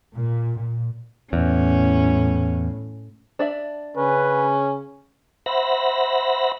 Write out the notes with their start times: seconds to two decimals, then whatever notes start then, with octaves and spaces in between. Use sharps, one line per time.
0.15 A#2
0.57 A#2
1.33 E2 A2 C#4
3.39 D4 D5 E5
3.96 C#3 C#4 B4
5.46 C5 E5 F#5 B5 A#6